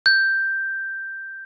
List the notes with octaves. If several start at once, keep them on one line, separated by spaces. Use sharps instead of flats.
G6